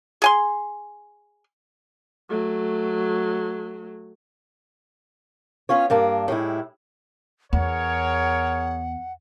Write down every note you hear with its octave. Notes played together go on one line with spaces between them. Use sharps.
G#4 G#5 C6
F#3 A3
B3 C#4 F4 C#5
G2 A#3 D4
A2 G3 G#3 E4
E2 G#4 A#4 C#5 F#5